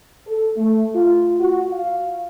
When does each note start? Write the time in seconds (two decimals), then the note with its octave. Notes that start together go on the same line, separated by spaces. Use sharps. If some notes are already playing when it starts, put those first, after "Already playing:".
0.28 A4
0.57 A3
0.96 F4
1.40 F#4
1.73 F5